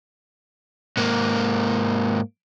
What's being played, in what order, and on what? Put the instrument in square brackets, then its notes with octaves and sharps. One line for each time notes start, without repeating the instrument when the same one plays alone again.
[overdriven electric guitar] G#2 A#3